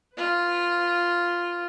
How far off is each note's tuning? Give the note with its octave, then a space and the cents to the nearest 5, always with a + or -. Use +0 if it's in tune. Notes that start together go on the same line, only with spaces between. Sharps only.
F4 +0 B4 +25